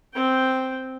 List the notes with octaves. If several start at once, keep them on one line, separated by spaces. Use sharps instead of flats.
C4 G5